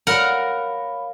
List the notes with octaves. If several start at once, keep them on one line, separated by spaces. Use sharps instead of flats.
A#4 C#5 F5 F#5 A#5 B5